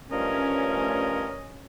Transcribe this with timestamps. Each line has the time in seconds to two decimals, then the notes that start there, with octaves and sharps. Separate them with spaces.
0.12 G2 F3 A3 C#4 A#4 D#5